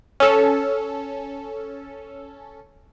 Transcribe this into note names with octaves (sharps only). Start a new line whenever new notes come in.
C#4 A4